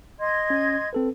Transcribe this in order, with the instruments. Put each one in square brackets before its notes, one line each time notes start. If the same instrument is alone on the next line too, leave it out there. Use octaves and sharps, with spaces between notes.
[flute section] D#5 C6 G#6
[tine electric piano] C#4
C4 A4 B4